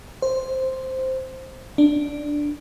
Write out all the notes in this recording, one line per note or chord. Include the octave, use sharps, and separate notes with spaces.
C5
D4